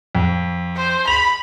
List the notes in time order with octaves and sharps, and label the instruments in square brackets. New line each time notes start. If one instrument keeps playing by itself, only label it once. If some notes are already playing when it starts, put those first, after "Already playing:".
[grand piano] F2
[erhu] C5
[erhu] B5 [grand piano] F7